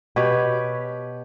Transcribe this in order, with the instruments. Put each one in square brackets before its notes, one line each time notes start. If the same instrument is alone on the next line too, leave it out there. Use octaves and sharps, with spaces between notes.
[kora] B2 G4 B4 C#5